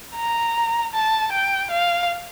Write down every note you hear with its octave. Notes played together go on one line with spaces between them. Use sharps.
A#5
A5
G5
F5